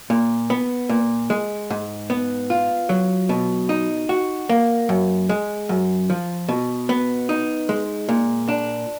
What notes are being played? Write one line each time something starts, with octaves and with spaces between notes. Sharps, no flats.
A#2
B3
A#2
G#3
G#2
B3
F4
F#3
B2
D#4
F#4
A#3
F#2
G#3
F#2
F3
B2
B3
D#4
G#3
A#2
D4